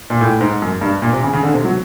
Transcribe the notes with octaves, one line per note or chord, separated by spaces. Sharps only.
A#2
A2
G#2
F#2
G2
A#2
C3
C#3
C#3
D3
C3
F#3